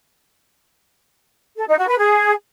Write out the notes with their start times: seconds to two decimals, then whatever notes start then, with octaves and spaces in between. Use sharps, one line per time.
1.57 A4
1.68 D#4
1.78 F#4
1.88 B4
1.98 G#4